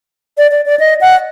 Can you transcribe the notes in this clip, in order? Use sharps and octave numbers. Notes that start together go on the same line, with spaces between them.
D5
D5
D5
D#5
F#5